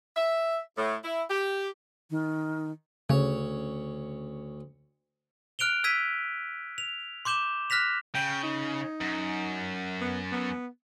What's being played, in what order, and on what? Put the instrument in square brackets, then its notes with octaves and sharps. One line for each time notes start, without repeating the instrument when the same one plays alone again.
[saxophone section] E5
A2
E4
G4
[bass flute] D#3
[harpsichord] D2 C#5 [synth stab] C#3
[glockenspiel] F6 F#6 D7 F7 G7
E6 G#6 B6 D#7
F7
C6 D6 G6 E7 G7
F6 F#6 A#6 B6 F7
[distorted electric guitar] C#3 [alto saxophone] G5
[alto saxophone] D#4
[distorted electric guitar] F#2
[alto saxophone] B3
B3